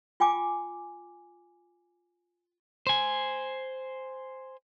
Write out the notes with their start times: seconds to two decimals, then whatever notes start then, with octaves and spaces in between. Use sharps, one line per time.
0.20 F4 G5 G#5 D6
2.87 C5 G#5